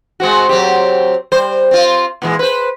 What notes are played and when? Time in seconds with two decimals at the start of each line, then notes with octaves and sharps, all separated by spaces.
0.20 G#3 C4 F#4
0.49 F#3 C4 G4
1.32 G3 C5
1.71 C4 F4
2.22 A#2 E3 G#3
2.39 B4 C5